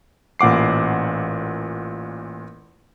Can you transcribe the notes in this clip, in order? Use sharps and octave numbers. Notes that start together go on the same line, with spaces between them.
A1 A#2 F#5 D6 C7